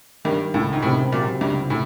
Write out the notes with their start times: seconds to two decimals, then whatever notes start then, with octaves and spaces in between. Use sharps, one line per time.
0.25 G2 D#3
0.54 C#2 A2
0.73 G#2
0.82 A2 C3
1.12 A#2 F#3
1.41 C#2 G2
1.70 A2